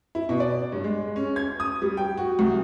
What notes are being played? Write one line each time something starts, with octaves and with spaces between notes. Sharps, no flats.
E4
B2
D5
G2
G#3
C#4
G#6
D#6
G3
G5
F#4
C2